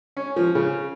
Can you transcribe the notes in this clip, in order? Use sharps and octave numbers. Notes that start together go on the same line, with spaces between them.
C#4
F3
C#3